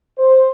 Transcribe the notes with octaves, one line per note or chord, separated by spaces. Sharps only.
C5